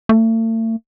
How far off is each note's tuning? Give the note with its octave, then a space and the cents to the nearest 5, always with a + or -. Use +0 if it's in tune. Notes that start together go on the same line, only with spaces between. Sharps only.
A3 +40